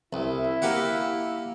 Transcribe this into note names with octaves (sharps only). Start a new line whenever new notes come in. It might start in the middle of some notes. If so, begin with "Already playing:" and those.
C2 E4
A#3 G4 F#5